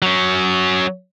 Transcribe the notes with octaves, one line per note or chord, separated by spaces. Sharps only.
F#3 C#4